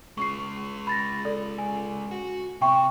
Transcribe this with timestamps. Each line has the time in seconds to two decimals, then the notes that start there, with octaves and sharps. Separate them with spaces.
0.18 G#3 C#4 C#6 C7
0.87 B5 A6 A#6
1.25 A4 D5
1.58 G#5
2.11 F#4
2.61 C3 E5 G5 C#6